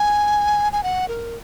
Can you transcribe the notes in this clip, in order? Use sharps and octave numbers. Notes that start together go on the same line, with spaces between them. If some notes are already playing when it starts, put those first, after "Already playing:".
Already playing: G#5
G#5
F#5
A#4